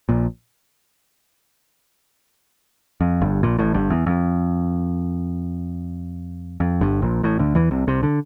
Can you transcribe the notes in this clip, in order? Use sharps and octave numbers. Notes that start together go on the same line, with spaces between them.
A#1 A#2
F2
G1 G2
A#1 A#2
A1 A2
G1 G2
E2
F2
F2
G1 G2
A#1 A#2
A1 A2
D2 D3
E2 E3
C2 C3
C2 C3
D3